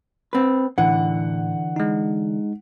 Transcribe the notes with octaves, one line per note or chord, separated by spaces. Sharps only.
C4 B4
A2 D3 E3 F#5
G#3 D#4